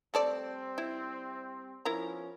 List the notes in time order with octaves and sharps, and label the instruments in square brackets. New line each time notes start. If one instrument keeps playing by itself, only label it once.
[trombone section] G3 C4 [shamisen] A3 A4 D5
[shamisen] E4
[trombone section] F3 B3 C#4 [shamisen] E4 A#4 A#5